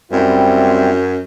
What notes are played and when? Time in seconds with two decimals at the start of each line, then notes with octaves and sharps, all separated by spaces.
0.12 F#2 G3 C4 E4